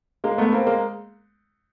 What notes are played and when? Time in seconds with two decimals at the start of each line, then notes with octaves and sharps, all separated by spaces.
0.24 G#3 A#3
0.38 A3 B3
0.52 A#3 C4
0.67 G#3 A#3